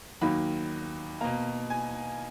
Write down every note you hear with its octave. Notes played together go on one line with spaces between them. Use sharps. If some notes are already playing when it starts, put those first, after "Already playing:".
D#2 D#3 F#3 A#3 B5
B2 A#3 A#5
G#5